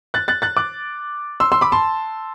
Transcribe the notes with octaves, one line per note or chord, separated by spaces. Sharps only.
F#6 A6
F#6 A6
F#6 A6
D6 F#6
C6 E6
C6 E6
B5 D6
A5 C6